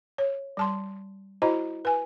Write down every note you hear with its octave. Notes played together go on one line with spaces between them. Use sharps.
C#5
G3 A5 C6
E4 F#4 C5 D#5 A#5
B4 G#5